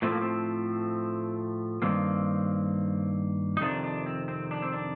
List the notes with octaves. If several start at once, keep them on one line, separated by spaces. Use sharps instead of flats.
A2 F3 A3 C4
A#3
C4
G2 D#3 A#3 C4
D#4
F2 C3 D#3 D4
D4
C4
C4
D4
C4
D4